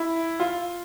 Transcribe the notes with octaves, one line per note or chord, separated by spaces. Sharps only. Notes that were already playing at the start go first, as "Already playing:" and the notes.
Already playing: E4
F4